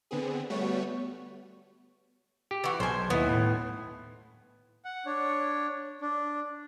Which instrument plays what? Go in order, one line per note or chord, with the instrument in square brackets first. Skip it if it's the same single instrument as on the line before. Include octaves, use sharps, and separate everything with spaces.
[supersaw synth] D3 B3 C4 G#4
G3 A3 B3 F#4 C#5
[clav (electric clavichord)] G4
[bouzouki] E3 F#4
[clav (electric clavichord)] B1 [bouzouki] C5 G#5
[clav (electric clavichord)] D#2 E4 [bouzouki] B3
[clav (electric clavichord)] A2
[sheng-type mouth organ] F#5
D4 C#5
D4